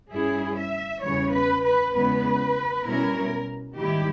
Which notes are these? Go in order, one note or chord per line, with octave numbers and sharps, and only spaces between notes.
G2 G3 C#4 E4 G#4
E5
E2 C#3 E3 G3 C#5
B4
B4
E2 C#3 G#3 B3 B4
B2 G3 C#4 E4 A#4
G#2 D#3 G3 A#3 E4 G4